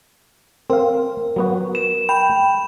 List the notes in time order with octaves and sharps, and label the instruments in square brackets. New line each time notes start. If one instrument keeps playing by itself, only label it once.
[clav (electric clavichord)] C4 F5 [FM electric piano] A#4
[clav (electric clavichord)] F#3 B3 F#4
[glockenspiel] E7
[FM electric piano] G5 [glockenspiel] B5